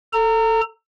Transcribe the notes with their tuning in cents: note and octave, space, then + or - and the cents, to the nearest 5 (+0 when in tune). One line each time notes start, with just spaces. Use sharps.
A4 +10 A#5 -25